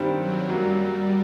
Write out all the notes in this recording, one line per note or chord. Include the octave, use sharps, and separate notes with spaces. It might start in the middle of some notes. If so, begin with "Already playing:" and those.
Already playing: G2 D#3 G3 C4
F#3
F#2 F#3 G3 A#3 F#4